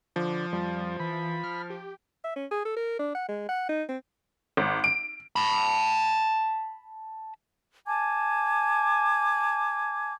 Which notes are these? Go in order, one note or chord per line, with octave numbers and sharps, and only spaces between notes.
D3 F3
F2 G3
E3 B5
F6
G4
E5
C#4
G#4
A4
A#4
D4
F#5
G#3
F#5
D#4
C4
G#1
D7
A5 B5
G#5 A5 D6 G#6